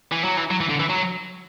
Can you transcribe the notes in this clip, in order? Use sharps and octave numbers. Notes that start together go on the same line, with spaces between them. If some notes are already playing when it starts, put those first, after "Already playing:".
E3
F#3
E3
F#3
E3
D3
E3
F#3